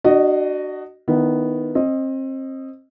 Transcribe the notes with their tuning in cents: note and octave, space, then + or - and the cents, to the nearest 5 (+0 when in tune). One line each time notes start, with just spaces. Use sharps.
D4 +30 F#4 +20 D#5 -5
D#3 -15 B3 +0 E4 +0
C4 +30 D#5 +0